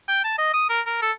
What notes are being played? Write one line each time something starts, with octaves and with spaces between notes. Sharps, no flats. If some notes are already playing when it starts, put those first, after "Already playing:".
G5
A5
D#5
D#6
A#4
A#4
A4